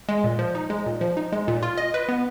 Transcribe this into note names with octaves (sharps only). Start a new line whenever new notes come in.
G#3
A#2
F3
D#4
G#3
A#2
F3
D#4
G#3
A#2
F4
D#5
B4
B3